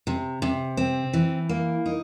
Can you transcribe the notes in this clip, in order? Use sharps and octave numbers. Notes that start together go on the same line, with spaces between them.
C3
C3
C4
E3
A#3
D#4